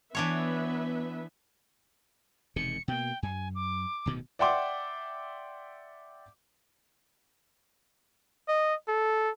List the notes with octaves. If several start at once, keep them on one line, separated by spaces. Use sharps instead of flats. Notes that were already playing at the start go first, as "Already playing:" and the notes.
E3 B3 D4 B4 C#5 E5
E1 C3 D#3 C#7
B2 A#3 G5
F#2 G#5
D6
D1 B2 D#3
D5 E5 F#5 G5 C6 D6
D#5
A4